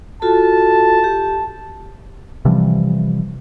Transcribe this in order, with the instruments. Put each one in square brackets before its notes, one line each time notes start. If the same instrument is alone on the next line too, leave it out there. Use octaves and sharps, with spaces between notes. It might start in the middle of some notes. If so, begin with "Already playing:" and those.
[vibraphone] F4 F#4 A4 [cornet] A5
[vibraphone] G4
[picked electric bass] C3 E3 F3 G3